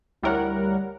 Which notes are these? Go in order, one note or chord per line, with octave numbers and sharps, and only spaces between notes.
D2 G3 E4 A#4 C#5 F#5